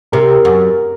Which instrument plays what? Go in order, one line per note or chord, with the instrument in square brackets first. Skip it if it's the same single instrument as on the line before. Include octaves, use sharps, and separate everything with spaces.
[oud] C3 [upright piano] A#4
[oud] F#2